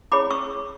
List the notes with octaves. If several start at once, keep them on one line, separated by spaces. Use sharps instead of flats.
E4 G#4 C#5 B5 D6
C#6 E6